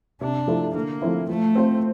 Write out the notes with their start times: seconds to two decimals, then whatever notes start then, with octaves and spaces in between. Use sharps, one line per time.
0.21 C3 D4
0.47 F3 A3 E4 A4
0.75 D3 A#3
1.02 F3 A3 C4 E4
1.29 F3 A3
1.55 C4 F4 C5